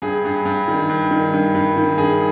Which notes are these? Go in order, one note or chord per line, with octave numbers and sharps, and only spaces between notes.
G2 G#4
G2
G2
D#3
G2
D#3
G2
G2
D#3
G2 G#4